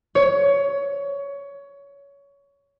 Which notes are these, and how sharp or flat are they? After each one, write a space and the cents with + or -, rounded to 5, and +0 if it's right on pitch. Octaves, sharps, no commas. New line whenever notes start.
C#5 +20